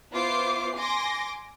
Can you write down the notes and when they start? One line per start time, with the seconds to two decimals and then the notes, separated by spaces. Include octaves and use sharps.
0.12 B3 E4 F4 C5 D6 C7
0.77 G#5 C6 D6 A#6 D7